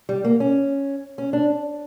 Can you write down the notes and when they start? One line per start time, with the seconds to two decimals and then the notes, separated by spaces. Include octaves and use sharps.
0.09 G3
0.24 A#3
0.40 C#4
1.18 C#4
1.33 D4